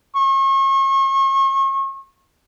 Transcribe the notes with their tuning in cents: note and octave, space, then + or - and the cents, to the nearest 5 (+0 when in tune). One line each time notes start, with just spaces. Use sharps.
C#6 -40